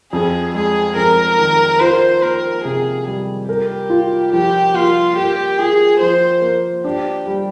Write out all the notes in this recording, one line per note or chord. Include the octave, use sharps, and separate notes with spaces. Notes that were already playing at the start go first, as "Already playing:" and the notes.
F2 G#4
G#3 G#4
F2 A#4
D#3
F4 C5
A#3 A#4
C3 G#4
G3
G4 A#4
F4
F3 G4
A#3 F4
G4 A#4
F4 G#4
F3 C5
A#3
D4 G4
G3